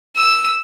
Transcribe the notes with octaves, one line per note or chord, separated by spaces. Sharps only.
E6